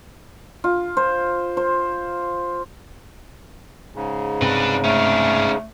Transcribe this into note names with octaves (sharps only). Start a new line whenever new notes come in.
F4
C5
C5
G#2 C#3
G2 C3 C4 D4 B4
A3 C#4 D4